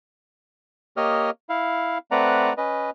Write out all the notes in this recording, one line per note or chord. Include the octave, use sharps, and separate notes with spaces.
A#3 G4 C#5 D#5 D#6 F6
E4 F5
A3 C4 B4 D5 F#5 A#5
C#4 B4 D#5